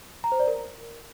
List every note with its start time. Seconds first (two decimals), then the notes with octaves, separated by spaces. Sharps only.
0.24 A#5
0.32 C5
0.40 D5
0.47 A#4